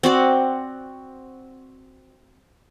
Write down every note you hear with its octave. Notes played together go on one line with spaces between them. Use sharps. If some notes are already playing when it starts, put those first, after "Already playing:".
C4 F#4 D5